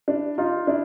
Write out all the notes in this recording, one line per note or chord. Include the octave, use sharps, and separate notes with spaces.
D4 E4
D#4 F4
D4 E4